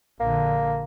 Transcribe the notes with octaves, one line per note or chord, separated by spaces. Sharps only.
A#1 D3 A#3